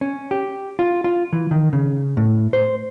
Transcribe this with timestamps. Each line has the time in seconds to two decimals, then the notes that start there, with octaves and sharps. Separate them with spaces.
0.01 C#4
0.31 G4
0.79 F4
1.04 F4
1.33 E3
1.51 D#3
1.73 C#3
2.17 A2
2.53 C5